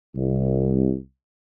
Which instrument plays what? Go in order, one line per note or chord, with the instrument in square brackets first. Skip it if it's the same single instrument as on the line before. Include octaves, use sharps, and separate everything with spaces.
[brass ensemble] C2